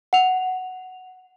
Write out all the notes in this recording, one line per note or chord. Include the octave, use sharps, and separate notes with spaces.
F#5 F7